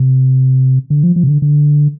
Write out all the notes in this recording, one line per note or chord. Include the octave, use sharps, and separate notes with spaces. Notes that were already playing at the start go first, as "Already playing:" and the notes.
Already playing: C3
D3
F3
F3
C3
D3
D3